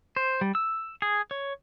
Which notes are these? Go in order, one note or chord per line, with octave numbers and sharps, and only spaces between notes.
C5
G3
E6
G#4
C#5